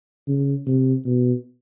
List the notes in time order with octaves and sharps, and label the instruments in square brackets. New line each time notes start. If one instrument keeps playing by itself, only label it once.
[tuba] C#3
C3
B2